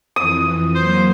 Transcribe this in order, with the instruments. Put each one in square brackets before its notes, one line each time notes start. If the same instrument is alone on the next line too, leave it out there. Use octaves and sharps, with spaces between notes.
[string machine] F2 E3 [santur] D#6
[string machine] F#3 A#3 [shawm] C5